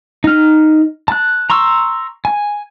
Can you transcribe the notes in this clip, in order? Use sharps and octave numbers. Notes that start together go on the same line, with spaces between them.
D#4 F6
A5 F#6
A#5 C6 C#6 E6
G#5